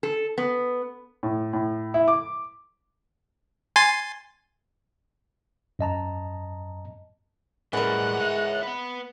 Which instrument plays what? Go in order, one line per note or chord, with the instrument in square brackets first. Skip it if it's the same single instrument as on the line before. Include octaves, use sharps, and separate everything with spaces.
[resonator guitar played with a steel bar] A4
B3
[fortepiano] A2
A2
E4
D6
[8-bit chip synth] G#5 C6 A6
[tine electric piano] F#2 D#5 A5 A#5
[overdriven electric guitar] A2 G3 [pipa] E3 A#4 [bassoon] G#3 [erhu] F#5
[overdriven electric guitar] C#5 E5
B4 F#5